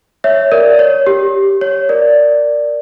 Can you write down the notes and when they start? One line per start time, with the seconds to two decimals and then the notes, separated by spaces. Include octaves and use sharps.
0.24 C#5 E5
0.52 A#4 D5
0.79 C#5
1.07 G4
1.61 C#5
1.89 A#4 D5